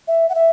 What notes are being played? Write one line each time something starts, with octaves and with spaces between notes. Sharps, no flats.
E5
F#5
E5